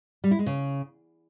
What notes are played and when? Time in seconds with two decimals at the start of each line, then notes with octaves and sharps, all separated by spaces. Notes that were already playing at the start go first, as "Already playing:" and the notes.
0.24 G3
0.31 E4
0.39 G#3
0.46 C#3